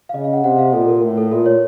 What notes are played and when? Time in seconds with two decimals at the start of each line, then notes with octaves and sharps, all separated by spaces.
0.09 F5
0.14 C#3 D#5
0.24 F5
0.33 F#5
0.43 C3 F#5
0.59 F5
0.73 A#2 A4
0.88 A#4
1.02 A2
1.17 A4
1.31 A#2 A#4
1.46 C#5